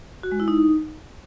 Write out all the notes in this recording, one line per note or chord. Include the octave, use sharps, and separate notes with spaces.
F#4
G#3
E4
D#4